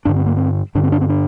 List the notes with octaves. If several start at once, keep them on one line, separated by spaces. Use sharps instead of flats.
G2 D3 D4
C4
A#3
C4
G2 D3 D4
C4
D4
C4
D4